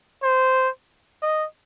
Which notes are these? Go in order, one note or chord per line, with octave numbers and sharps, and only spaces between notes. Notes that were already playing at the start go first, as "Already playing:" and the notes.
C5
D#5